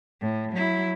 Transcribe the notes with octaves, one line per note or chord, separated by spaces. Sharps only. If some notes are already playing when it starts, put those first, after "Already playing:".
A2
F#3 E4